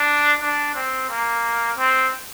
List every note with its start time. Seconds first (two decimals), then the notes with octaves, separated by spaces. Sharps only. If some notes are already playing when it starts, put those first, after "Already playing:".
Already playing: D4
0.41 D4
0.75 C4
1.10 A#3
1.78 C4